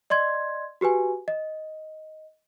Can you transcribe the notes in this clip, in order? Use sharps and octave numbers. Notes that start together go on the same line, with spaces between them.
D5 D#5 C6 G#6
F#4 G4 B4 G#5
D#5